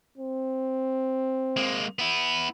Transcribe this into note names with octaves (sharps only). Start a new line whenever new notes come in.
C4
G#3 A#3
B3 E4